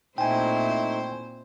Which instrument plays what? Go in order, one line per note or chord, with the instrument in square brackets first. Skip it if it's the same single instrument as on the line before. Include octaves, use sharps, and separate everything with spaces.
[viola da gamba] A#2 C4 [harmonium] A3 D#4 E4 [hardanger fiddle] C5 [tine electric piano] G5 G#5